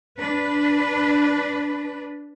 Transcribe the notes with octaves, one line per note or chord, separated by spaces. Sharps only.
D4 B4